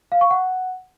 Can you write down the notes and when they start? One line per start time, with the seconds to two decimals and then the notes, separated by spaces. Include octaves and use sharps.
0.12 F5
0.21 C#6
0.31 F#5